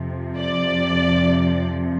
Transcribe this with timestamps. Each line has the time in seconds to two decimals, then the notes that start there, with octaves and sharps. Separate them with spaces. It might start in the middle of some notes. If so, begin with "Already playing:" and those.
Already playing: F2 C3 F3
0.37 D5